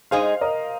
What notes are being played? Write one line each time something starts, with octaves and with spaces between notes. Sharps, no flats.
G#3 D#4 G#4 C5 F5
A#4 D#5